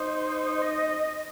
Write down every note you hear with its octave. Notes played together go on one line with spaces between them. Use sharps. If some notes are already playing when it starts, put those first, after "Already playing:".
Already playing: D#4 C5
D#5